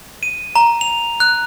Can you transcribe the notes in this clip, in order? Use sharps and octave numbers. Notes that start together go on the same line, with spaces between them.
D#7
A#5
F7
F#6